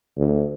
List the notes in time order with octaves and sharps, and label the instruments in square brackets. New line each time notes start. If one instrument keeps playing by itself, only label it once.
[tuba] D2